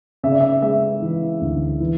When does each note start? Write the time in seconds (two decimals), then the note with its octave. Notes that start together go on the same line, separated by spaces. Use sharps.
0.23 C#3 E5
0.32 D5
0.41 E5
0.62 G#3 E5
1.02 E3
1.41 D2
1.80 E3